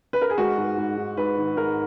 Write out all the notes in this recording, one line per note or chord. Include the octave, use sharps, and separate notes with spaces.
B4
A#4
G#4
G#3 F#4
G#2
G#2
G#2
G#2 B4
D#3
G#2 A#4